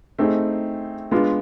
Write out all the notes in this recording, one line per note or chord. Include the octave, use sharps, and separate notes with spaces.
A3 C4 D#4 G#4
G#3 B3 D4 F4